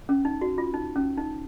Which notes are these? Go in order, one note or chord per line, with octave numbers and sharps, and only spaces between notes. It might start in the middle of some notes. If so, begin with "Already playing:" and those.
C#4
D#4
F#4
F4
D#4
C#4
D#4